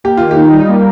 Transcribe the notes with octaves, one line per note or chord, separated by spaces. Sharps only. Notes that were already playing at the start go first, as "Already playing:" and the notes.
A#3 G4
D#3 F4
G4
D#4
G3
A#3